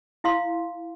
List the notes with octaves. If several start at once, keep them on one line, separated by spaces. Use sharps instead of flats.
E4 F5 C6